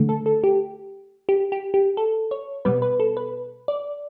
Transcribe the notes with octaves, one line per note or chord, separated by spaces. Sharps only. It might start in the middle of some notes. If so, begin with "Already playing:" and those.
Already playing: D3 A3
A4
A4
G4
G4
G4
G4
A4
C#5
B2 G3 B3 B4
B4
A4
B4
D5